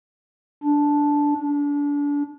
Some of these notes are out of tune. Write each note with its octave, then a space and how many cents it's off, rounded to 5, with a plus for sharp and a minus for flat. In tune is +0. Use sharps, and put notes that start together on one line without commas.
D4 -10
D4 -30